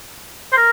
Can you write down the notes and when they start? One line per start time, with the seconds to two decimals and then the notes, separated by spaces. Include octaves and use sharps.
0.52 C5
0.57 A#4